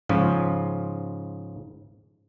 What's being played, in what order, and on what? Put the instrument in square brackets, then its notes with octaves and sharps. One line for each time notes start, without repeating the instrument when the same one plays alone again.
[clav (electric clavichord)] G#2 C#3 F3